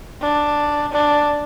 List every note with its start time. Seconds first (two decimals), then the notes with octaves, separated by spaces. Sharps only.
0.22 D4
0.92 D4